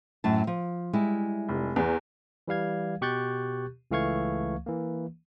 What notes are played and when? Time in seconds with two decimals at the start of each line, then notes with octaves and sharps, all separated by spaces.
0.24 F#2 A2 A5
0.47 F3
0.93 G3 G#3 E4
1.49 F1
1.76 E2 B3
2.48 E3 G3 F5 G#6
3.01 B2 G4 C#6 F#6 G6 A6
3.91 C#2 E3 A3 F5 C#6 G#6
4.66 E3 A#3